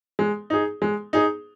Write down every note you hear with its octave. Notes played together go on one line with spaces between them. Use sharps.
G#3
D#4 G#4
G#3
D#4 G#4